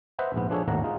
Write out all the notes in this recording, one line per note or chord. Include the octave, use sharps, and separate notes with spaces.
B4 C5 D#5 E5 F#5
A#1 G#2 B3
F3 D4 G#4 A4 C#5
G#1 D#2 A2 D#3 F#5 A#5
G#3 D#4 F4